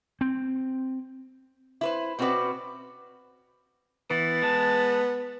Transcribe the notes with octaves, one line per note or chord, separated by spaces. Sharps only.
C4
E4 B4 C5
B2 C4 C#4 F#4 B4 D5
E3 B3 A6
G#3 A5